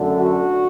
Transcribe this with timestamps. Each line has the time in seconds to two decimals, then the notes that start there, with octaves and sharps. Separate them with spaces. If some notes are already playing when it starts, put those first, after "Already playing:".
Already playing: F#2 D3 A3
0.20 F#4